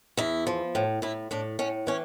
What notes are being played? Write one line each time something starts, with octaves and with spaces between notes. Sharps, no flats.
E2 E4
F3
A2
A2 E4
A2 D4
A2 C#4
E3 C#4